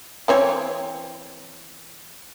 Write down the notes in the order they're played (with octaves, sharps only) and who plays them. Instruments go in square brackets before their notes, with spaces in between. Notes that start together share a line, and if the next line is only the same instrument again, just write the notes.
[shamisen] E3 C4 C#5